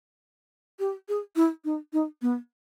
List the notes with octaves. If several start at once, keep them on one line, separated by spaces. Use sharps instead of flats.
G4
G#4
E4
D#4
D#4
B3